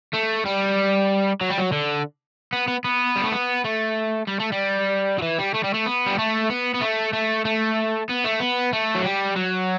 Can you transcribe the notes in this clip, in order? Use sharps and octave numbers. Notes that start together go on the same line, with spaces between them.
A3
G3
F#3
G3
F#3
D3
B3
B3
B3
G3
A3
B3
A3
G3
A3
G3
F#3
E3
G3
A3
G3
A3
B3
G3
A3
B3
B3
A3
A3
A3
B3
A3
B3
A3
F#3
G3
F#3